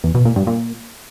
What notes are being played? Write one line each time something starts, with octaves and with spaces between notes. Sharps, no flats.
E2
B2
A#2
G2
A#2